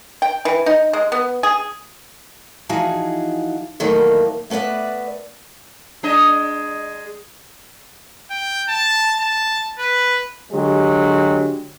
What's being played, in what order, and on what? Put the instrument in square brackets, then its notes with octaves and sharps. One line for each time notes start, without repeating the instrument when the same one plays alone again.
[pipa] G5
E3
D#4
G#3
B3
G#4
[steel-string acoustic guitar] E3 F3 D#4 F#4 G#4
E2 B2 D#3 F#3 A3 A#3
A3 B3 B4 D5 E5
[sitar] G#3 D4 D#5
[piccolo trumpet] G5
A5
A5
B4
[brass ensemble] D3 F#3 G#3 G4